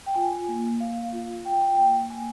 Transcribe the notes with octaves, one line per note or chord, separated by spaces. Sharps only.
G5
F4 G#5
A#3
A#3 F5
F4
F4 G5
G5
A#3 G5
A#3 G#5